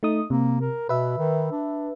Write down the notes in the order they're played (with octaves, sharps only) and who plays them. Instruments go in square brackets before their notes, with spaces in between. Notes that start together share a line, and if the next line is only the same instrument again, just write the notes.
[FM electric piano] A3 D#4 D#6
[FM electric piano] C3 [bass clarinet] A#3
[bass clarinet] A#4
[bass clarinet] B2 [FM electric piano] B4 E5
[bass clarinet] D#3
D4